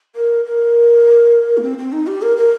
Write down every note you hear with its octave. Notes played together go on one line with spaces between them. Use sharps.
A#4
A#4
A#3
C4
C4
D#4
G4
A#4
A#4